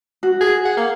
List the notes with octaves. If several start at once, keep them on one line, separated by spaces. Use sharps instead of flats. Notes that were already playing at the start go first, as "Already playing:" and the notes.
F#4
G#4
F#5
A#3